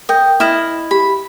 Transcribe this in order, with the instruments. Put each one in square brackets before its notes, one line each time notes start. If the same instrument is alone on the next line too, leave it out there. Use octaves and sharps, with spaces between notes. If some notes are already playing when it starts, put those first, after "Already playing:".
[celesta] A#4 G5 G6 [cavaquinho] D#5
[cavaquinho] E4 D#5 [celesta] E5 F6 E7
[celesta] G4 [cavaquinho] B5